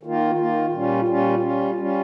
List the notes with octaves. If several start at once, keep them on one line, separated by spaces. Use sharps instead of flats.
D#3 A#3 F4
D#3 A#3 F4
A#2 G3 C#4 F4
A#2 G3 C#4 F4
G3 C#4 F4
G3 C#4 F4